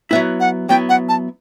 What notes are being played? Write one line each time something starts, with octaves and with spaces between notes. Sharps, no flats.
F#3 B3 E4 E5
F#5
F#3 B3 E4 G5
F#5
A5